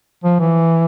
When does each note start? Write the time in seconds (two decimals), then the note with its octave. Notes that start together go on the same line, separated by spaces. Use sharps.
0.24 F3
0.40 E3